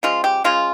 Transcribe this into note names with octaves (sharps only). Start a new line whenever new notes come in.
C#3 F3 G#3 F4
G4
C#3 G#3 F4